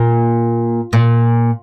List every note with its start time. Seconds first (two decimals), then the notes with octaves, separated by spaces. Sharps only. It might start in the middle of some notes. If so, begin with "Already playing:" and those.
Already playing: A#2
0.93 A#2